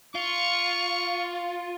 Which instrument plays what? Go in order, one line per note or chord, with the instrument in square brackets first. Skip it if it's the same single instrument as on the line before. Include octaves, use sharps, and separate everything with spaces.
[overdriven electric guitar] F4 [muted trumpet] C#6